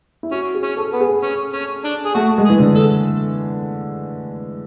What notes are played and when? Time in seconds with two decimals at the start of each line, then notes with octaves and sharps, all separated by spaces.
0.23 E4
0.32 C#4 F#4
0.55 G#4
0.63 C#4
0.77 A4
0.93 B3
1.01 G#4
1.23 C#4
1.53 C#4
1.84 D4
2.05 G#4
2.14 A3 F#4
2.38 G#3
2.45 G#4
2.50 E3
2.60 D3
2.76 A4